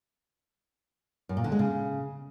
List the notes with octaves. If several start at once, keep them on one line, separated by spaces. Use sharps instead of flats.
F#2
A#2
D3
G#3
C#3